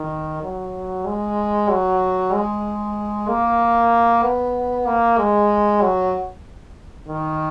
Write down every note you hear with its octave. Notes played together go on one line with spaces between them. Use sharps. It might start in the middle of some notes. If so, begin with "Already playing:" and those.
Already playing: D#3
F#3
G#3
F#3
G#3
A#3
B3
A#3
G#3
F#3
D#3